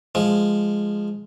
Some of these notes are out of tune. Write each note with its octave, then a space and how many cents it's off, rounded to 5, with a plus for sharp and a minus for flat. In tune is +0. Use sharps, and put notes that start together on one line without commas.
F3 +0 G#3 -5